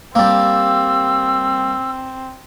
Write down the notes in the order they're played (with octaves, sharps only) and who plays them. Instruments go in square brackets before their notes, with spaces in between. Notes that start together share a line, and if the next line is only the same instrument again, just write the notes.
[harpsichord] G3 A#3 [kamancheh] C4 [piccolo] E6